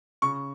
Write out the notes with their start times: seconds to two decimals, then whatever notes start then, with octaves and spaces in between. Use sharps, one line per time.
0.22 C#3 C#6